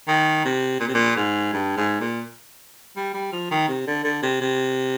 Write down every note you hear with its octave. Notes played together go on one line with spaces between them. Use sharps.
D#3
C3
A#2
C3
A#2
G#2
G2
G#2
A#2
G3
G3
F3
D#3
C3
D3
D3
C3
C3